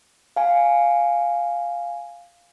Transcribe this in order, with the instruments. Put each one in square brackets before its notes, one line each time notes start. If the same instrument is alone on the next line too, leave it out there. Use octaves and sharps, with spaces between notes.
[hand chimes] F5 G#5